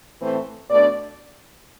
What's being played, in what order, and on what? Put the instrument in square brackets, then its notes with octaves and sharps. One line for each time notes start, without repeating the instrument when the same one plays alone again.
[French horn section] A2 E3 A3 C4 C5
B2 A3 D4 D5